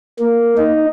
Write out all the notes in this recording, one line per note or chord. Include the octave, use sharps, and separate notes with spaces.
A#3
D#4